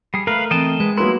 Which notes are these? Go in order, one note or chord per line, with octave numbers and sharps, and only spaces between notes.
G3 G#4
A3 A#4 B4 F5
E3 C4 D#5 G5 A5
G#3 B4
F#3 A#3 B3 E4 C6